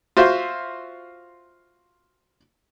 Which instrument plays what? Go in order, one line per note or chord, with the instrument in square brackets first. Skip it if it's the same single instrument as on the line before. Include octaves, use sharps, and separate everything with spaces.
[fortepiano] F4 F#4 C5 E5